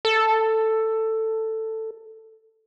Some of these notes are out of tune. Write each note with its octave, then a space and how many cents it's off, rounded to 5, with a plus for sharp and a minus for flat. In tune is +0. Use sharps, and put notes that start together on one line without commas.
A4 +10